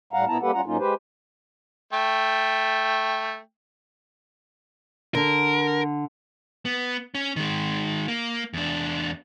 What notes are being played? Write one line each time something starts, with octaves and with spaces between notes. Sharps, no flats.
A2 G3 F5 F#5 A#5
A#2 B3 E4 A5 A#5
G3 A#3 G4 A4 B4 F#5
G3 C#4 F4 F#5 A#5
G#2 F#3 A#3 C#4 D#4 F4
G#3 G4 B4 C5
A3 G5
D3 A#4
B3
C#4
D#3 G#3
A#3
E2 D4